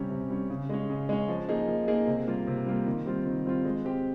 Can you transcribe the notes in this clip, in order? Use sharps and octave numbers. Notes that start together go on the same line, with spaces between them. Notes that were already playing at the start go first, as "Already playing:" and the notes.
Already playing: C3 G3 C#4
C3
G3 C#4
C#3
G#3 C#4
C#3
G#3 C#4
F3
A#3 D#4 G#4
F3
A#3 D#4 G#4
C3
G3 A#3 F4
C3
G3 A#3 F4
D#3
G3 C4 F4
D#3
G3 C4 F4
G#3
C4 G4